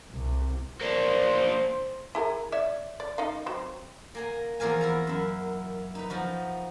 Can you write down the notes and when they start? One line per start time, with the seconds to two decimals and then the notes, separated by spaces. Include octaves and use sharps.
0.12 C2
0.81 A#3 D4 C5
2.15 E4 G#4 A#4
2.52 C#5 D5 E5
3.00 D5
3.18 D#4 D#5 F5
3.46 F#3 C4
4.15 A#3 G#5 A#5
4.60 E2 F3 A#3 A#4 G#5
4.81 E4 A#4 A#5
5.07 F#2 E4
5.95 D#4 B4
6.10 F3 D#4 F#4